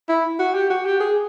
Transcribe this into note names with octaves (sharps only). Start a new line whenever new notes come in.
E4
F#4
G4
F#4
G4
G#4